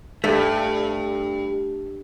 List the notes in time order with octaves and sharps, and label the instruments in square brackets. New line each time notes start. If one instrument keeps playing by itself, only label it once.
[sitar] G2 [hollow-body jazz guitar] A3